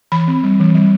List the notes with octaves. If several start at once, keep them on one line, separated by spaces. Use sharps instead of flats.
E3 B5
C4
G3
E3
G3